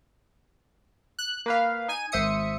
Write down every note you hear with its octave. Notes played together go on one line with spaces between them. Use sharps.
F#6
A#3 B4 F5
D#4 G#5 D#7
G#1 C5 E5 D#6 C#7